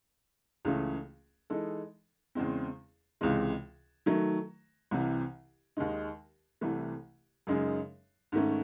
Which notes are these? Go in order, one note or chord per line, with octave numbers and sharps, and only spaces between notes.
C#2 C#3 E3 A3 C#4
E3 G#3 D#4 A4
E2 C#3 G#3 C4
C#2 C3 E3 G#3
D#3 F#3 A3
C2 C3 E3
D#2 D#3 G#3 D#4
C2 C3 E3 A3
F#2 C#3 G#3 D#4 G#4
G#2 D#3 A3 C#4